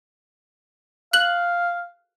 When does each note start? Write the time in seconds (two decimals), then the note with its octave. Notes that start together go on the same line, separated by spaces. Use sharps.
1.13 F5 F#6 F#7